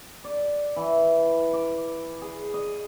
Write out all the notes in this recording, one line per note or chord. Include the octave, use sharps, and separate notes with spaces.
D5
E3
D6
G#4
D#5